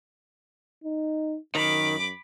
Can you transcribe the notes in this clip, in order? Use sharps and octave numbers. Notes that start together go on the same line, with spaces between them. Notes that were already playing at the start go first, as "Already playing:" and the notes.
D#4
F#2 D#3 B5 D6